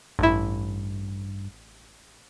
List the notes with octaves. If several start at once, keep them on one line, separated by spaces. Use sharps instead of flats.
A1 G2 E4